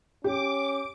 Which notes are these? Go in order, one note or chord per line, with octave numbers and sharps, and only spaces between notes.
C#4 G4 D6